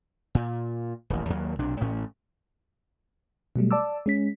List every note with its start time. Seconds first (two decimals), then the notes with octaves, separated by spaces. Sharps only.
0.35 A#2
1.10 D#1 A1
1.30 D#2 F#3 A#3
1.59 B1 C3 D4
1.80 A1 A2 C#4
3.56 B2 F#3 G3 A3
3.71 D5 A5 D6 E6
4.06 G#3 C#4 B6